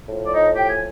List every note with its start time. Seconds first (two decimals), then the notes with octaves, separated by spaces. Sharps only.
0.08 A2 F3
0.25 D5
0.32 D#4 D#5
0.55 G4 G5
0.68 G#5